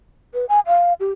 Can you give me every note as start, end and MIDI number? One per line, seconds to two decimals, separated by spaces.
0.34 0.45 71
0.49 0.60 80
0.67 0.93 77
1.00 1.11 67